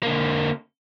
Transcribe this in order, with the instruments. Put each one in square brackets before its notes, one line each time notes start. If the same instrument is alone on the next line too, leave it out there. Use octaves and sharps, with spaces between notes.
[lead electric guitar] D3 A#3